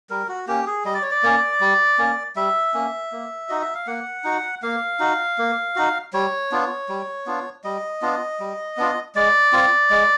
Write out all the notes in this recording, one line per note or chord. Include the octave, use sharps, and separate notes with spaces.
G3 A#4
F#4
A#3 C#4 G4
G#4
G3 D#5
D5
C#5
D5
A#3 C#4
G3
A#3 C#4
G3 E5
A#3 C#4
A#3
D#4 F#4 D#5
E5
F5
A#3 F#5
D#4 F#4
A#3 F5
D#4 F#4
A#3
D#4 F#4
G3 C#5
B3 D4 F4
G3
B3 D4 F4
G3 D#5
B3 D4 F4
G3
B3 D4 F4
G#3 D5
C4 F4
G#3